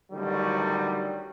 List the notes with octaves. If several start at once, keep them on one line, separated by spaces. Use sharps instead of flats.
A1 D3 D#3 F#3 G3